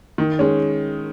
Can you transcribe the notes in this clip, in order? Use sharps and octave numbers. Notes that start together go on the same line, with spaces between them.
D#3
G#3 C#4